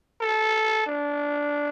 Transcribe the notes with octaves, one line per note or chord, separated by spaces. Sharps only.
A4
D4